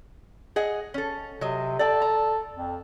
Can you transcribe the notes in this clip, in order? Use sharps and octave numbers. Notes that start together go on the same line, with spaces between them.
G#4 D#5 F#5
C#4 A4
C3 F#3 D#5
A4 D5 G5
A#5
F2